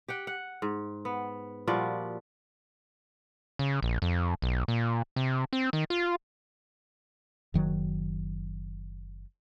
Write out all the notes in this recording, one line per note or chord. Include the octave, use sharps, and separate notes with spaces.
G4 F#5 G5
F#5
G#2
B3
A#2 F3 G3 F#4
C#3
A#1
F2
B1
A#2
C3
C4
D#3
F4
F#1 D#3 F#3